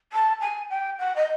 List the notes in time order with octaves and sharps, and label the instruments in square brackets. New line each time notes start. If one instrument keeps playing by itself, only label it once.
[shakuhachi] A5
G#5
G5
F#5
D#5